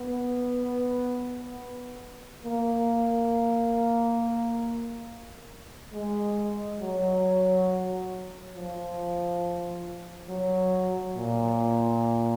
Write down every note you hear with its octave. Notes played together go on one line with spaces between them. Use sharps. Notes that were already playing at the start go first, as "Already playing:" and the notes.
Already playing: B3
A#3
G#3
F#3
F3
F#3
A#2